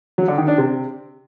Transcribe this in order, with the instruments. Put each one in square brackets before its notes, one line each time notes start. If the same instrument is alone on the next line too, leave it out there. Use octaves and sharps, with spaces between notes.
[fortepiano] F#3
D3
D#3
D4
C3